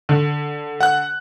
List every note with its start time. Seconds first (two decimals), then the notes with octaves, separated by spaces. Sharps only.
0.09 D3
0.80 F#5 F#6